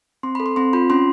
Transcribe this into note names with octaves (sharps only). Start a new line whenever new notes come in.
C4 C6
B5
A4
C6
C4 C6
F4 B5
C#4 C6